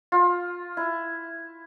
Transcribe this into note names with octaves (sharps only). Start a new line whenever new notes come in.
F4
E4